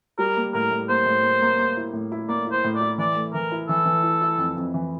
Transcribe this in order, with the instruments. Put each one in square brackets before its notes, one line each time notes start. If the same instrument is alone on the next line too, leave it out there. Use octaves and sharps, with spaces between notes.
[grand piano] G3 [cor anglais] A#4
[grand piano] A#3
[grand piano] A2 [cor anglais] A#4
[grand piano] A2
[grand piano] A#3 [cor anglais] C5
[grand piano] A2
A#3
A#3
A#3
E4
A2
E4
[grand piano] A#3 [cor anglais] D5
[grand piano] E4
[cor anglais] C5
[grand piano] A2
[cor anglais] D5
[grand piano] E4
[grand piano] E3 [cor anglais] D5
[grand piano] A3
[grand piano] E3 [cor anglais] A#4
[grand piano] E4
[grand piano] E3 [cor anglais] A4
[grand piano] E3
E4
E4
F2
F2
E3